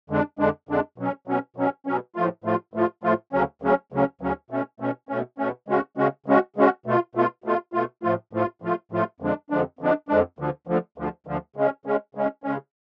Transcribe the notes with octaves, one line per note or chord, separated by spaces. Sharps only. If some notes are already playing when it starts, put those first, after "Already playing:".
F2 D3 G#3 D4
F2 D3 G#3 D4
F2 D3 G#3 D4
B2 F#3 C#4
B2 F#3 C#4
B2 F#3 C#4
B2 F#3 C#4
A2 F3 A3 F4
A2 F3 A3 F4
A2 F3 A3 F4
A2 F3 A3 F4
D2 C#3 F#3 C#4
D2 C#3 F#3 C#4
D2 C#3 F#3 C#4
D2 C#3 F#3 C#4
B2 A3 C#4
B2 A3 C#4
B2 A3 C#4
B2 A3 C#4
C#3 G#3 C#4 F#4
C#3 G#3 C#4 F#4
C#3 G#3 C#4 F#4
C#3 G#3 C#4 F#4
B2 A3 F4
B2 A3 F4
B2 A3 F4
B2 A3 F4
A2 F3 A3 F4
A2 F3 A3 F4
A2 F3 A3 F4
A2 F3 A3 F4
F2 D3 F3 G#3 D4
F2 D3 F3 G#3 D4
F2 D3 F3 G#3 D4
F2 D3 F3 G#3 D4
D2 D3 F3
D2 D3 F3
D2 D3 F3
D2 D3 F3
C#3 G#3 C#4
C#3 G#3 C#4
C#3 G#3 C#4
C#3 G#3 C#4